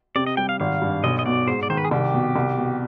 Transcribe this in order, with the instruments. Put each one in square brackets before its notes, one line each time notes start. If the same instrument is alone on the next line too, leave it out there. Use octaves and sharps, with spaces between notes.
[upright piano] C3 [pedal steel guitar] D5
[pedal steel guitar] D#5
[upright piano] G3 [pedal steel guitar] G5
[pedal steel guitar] F5
[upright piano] G#1 [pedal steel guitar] F5
[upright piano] G2
[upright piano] B1 [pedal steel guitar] D#5
[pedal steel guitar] D#5
[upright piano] B2 [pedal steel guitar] D5
[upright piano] G#2 [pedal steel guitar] C5
[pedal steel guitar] D5
[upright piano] D#3 [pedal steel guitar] C5
[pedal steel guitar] B4
G#4
[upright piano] C2 [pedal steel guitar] G4
[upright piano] B2
C2
B2